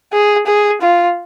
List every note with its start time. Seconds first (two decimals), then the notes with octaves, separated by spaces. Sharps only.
0.13 G#4
0.47 G#4
0.81 F4